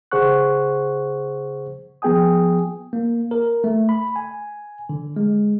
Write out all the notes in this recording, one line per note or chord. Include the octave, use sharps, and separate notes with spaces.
C#3 G#4 C5 F#5 C#6 F#6
F3 B3 G#4 G5 G#5 D#6
A#3
A#4
A3
B5
G#5
D3
G#3